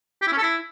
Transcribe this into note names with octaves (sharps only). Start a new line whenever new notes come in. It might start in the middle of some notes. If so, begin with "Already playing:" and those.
G4
E4
C#4
A4
E4